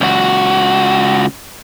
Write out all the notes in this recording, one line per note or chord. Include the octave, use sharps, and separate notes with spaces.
C#2 F#4